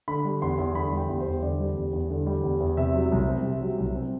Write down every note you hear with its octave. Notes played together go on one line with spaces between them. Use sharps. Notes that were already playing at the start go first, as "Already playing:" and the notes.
D3 B5
G3
E2 C6
E2
D3 B5
G3
G5
E2
C5
E2
D3 D5
G3
E2
E2
D3
G3
E2
E2
C3 E5
F#3
C2
C4
C3
F#3
C2
C4